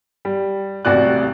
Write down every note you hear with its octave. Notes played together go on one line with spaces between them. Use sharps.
G3
D#1 A1 C3 F#4 D5 F#6